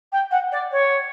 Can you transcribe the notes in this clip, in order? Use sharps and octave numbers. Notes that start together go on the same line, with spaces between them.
G5
F#5
D5
C#5